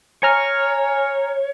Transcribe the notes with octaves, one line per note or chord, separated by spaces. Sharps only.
C#5 G#5 A#5 F6